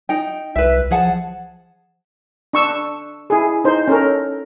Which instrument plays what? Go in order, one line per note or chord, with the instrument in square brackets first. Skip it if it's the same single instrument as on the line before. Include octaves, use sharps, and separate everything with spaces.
[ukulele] D#4 G5
[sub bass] C2 [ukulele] B4 E5
[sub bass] F3 [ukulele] G#4 F#5 A5
[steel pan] D4 C#6 E6
E4 G#4
D#4 C5
C#4 A4 A#4